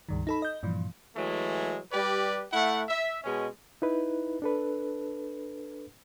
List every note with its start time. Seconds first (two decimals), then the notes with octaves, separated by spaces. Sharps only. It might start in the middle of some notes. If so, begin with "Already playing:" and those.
0.09 C#2 G2 D#3
0.27 D#4 A4 B5
0.42 D#5 G6
0.63 G2 A#2 E3 F3
1.16 E3 F#3 G#3 A3
1.92 G3 G4 B4 D5
2.53 A3 E4 F#5
2.89 E5
3.24 B2 G#3 C#4
3.82 D#4 E4 B4
4.42 D4 A4 B4